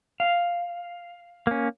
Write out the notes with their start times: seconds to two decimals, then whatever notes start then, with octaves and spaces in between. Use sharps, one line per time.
0.20 F5
1.47 A#3 C#4